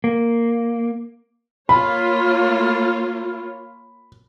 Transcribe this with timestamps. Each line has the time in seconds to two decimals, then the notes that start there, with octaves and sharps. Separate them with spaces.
0.04 A#3
1.69 A#3 F4 C#5 B5